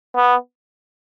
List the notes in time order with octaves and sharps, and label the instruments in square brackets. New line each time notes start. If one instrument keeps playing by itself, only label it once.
[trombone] B3